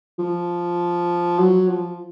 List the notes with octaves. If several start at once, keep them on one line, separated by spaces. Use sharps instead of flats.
F3
F#3
F3